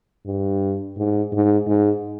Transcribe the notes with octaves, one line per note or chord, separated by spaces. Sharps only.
G2
G#2
G#2
G#2